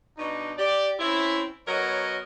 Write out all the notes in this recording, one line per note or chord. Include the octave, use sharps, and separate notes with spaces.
B2 D4 D#4
G4 D5
C4 C#4 E4
F#3 B3 A#4 C#5 D#5